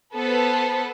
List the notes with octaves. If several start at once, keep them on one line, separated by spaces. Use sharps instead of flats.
B3 A4 B4 C5